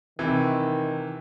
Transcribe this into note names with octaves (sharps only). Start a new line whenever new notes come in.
C3 D#3 E3